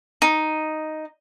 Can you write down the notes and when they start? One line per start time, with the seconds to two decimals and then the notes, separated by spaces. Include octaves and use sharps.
0.22 D#4